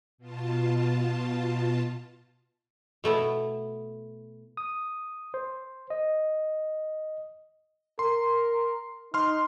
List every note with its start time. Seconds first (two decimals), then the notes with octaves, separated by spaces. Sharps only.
0.18 B2 F4 A5
3.04 B2 A3 B3 E4
4.57 D#6
5.34 C5
5.90 D#5
7.99 A#4 C6
9.14 D#4 C6 F6